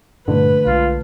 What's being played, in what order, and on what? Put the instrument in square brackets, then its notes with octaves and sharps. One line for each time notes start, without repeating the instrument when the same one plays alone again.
[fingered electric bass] G2 A#2 E3 [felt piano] D3 A3 [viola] B4
[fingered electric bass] B1 G#3 [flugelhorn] F4